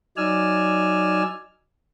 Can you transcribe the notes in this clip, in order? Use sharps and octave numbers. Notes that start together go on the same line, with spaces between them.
F#3 D#4 D5 G#5 E6 F6